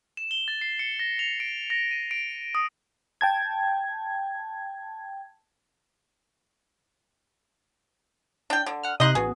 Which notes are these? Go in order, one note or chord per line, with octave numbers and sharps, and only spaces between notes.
E7
G7
A6
C7
C#7
A#6
F7
D7
A#6
D#7
D7
D#6
G5 A5 G#6
D4 G5
D3
F#5 F6
C3 D#4 D#5 C6 F#6
A1 B3 F#4 G#4